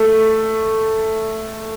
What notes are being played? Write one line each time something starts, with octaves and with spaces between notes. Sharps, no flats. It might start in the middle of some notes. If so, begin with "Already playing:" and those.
Already playing: A3